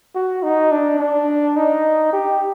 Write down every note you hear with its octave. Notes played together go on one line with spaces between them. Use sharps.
F#4
D#4
D4
D4
D#4
G4